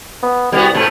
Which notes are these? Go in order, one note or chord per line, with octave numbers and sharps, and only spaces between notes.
B3
C2 G3 B3 F#4
G#2 C3 A3